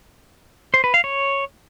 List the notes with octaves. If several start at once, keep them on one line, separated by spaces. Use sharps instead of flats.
C5
B4
F5
C#5